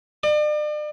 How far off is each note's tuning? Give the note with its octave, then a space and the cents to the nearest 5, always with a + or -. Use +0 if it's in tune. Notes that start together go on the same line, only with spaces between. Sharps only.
D5 +40